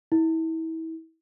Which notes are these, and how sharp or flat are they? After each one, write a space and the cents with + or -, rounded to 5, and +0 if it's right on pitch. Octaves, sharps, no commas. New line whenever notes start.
E4 -30